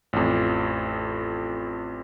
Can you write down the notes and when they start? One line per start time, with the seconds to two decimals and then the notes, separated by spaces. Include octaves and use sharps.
0.13 A1 F2